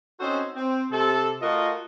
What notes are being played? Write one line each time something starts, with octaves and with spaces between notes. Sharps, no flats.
C4 C#4 D#4 F#4 A4 C5
C4
C3 A4
A3 F4 F#4 A#4 D#5